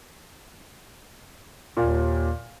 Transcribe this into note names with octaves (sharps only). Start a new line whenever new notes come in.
D#2 A#2 F5